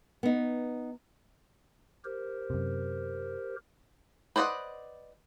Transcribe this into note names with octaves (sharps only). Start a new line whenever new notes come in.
B3 D#4
G4 A#4 C5
F#2 C3
B4 C5 D5 D#5 F#5